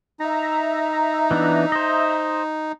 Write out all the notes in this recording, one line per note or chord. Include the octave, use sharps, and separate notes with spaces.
D#4 E5 A#5
E3 B3 D4
C5 D#5